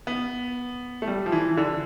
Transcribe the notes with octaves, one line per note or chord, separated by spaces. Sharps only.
B3
A3
G3
F3
E3
E3
D3